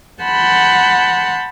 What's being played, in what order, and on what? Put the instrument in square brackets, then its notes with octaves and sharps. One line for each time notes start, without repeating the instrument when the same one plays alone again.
[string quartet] F#5 A5 B5 C6 G6